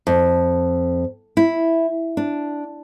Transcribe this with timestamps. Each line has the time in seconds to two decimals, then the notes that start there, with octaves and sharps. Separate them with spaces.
0.07 F2
1.37 E4
2.17 D4